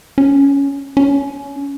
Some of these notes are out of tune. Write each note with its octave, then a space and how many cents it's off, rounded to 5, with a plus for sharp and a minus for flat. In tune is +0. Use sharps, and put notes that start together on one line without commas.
C#4 +10
C#4 +25